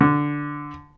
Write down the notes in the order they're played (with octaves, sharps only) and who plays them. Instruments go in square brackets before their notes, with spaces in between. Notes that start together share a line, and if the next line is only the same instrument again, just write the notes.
[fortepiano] D3